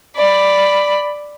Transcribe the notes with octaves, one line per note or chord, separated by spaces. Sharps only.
D5 B5